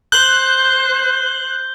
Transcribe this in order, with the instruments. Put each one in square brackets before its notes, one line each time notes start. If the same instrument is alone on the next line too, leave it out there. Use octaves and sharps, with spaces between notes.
[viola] C5 [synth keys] F#6 [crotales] G6 G7